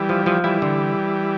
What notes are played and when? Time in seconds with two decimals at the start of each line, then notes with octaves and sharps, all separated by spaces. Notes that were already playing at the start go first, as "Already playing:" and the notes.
Already playing: E3 G3
0.09 F3
0.26 F3
0.44 E3 G3 E4
0.62 D3